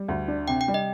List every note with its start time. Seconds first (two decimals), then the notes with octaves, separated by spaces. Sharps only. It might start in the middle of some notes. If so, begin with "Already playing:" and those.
Already playing: G3
0.08 D2
0.28 D4
0.48 C3 G5
0.61 G5
0.68 G3
0.74 D#5